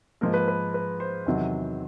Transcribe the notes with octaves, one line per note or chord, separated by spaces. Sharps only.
G#2 F3 A#3 A#4
B4
B4
B4
C5
E2 C3 D#3 F#3